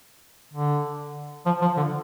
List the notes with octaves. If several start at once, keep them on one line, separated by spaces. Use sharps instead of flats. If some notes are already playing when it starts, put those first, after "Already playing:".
D3
F3
F3
D3